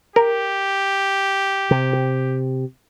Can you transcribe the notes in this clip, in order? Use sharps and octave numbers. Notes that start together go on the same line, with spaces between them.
G4 A#4
C3